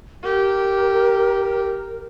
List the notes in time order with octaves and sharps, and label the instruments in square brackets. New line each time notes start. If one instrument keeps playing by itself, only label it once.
[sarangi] G4 [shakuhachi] A#4